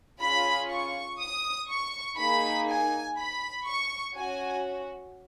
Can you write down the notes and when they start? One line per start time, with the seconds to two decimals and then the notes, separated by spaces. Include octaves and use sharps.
0.21 C#4 F4 G#4 B5
0.70 C#6
1.19 D#6
1.69 C#6
2.18 A#3 D#4 G#4 B5
2.68 G#5
3.17 B5
3.66 C#6
4.15 C#4 F#4 G#5